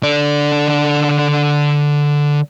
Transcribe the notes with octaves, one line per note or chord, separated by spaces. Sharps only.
D3 D5